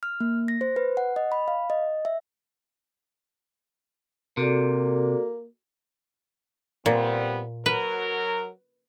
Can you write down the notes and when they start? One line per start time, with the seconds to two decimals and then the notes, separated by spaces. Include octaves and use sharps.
0.03 F6
0.20 A#3
0.48 A#6
0.61 C5
0.76 B4
0.97 F#5
1.16 D#5
1.32 B5
1.48 F5
1.70 D#5
2.05 E5
4.37 C3 A#3 F#4 A4 D5
6.86 A#2 G3 B3 C4
7.66 F#3 A#4 B4